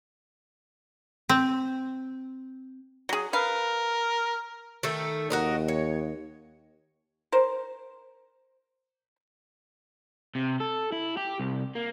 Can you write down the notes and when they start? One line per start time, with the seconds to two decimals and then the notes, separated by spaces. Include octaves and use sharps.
1.29 C4
3.09 F#3 G#4
3.33 A#4 B4 F5
4.83 D#3 A3 A4
5.30 D#2 F#4 A#4 D#5
5.68 C#5
7.32 A#4 C5
10.35 C3
10.60 A4
10.92 E4
11.17 G4
11.40 C2
11.75 A#3